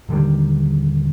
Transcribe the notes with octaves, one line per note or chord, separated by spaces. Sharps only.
D#1 D3 D#3 G3